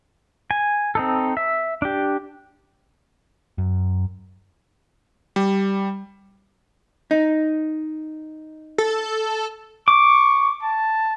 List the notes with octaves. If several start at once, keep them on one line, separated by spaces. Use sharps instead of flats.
G#5
C4 D#4 A4
E5
D4 G4
F#2
G3
D#4
A4
C#6 D6
A5